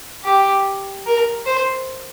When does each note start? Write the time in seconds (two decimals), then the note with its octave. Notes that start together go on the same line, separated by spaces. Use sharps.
0.25 G4
1.06 A#4
1.46 C5